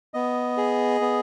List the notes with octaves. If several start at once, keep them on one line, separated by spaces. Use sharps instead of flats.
B3 D#5
G#4
B3